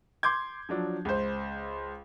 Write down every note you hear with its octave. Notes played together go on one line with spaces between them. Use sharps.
C6 D6 G6 G#6
F3 F#3 D4
C#2 C5